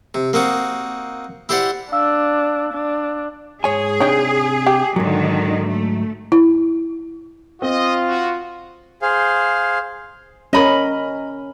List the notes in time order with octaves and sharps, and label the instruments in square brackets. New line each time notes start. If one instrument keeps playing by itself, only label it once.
[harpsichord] C3
A#3 C4 D#4 F#4
E4 G4 C5 D5 F#5
[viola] D4 [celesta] F5 E6
[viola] D4
[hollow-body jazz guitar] G#2 C#5 G#5 [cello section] G#4
[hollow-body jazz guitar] C3 D4 G5 [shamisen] D#4 C#5
[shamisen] G4
[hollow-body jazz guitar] G#2 F#3 [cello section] D3 D#3
[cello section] A3
[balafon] E4
[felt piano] C4 [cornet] F4 [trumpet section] D#5
[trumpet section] F#4
[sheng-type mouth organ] G#4 C5 F5
[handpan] C#4 A#4 [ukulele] D#5 B5